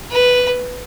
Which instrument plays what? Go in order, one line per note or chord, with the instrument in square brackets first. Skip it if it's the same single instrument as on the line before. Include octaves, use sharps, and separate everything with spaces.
[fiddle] B4